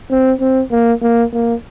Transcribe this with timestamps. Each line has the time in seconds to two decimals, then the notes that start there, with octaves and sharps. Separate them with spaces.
0.11 C4
0.41 C4
0.71 A#3
1.02 A#3
1.33 A#3